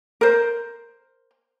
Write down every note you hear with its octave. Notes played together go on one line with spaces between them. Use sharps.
A#4 C5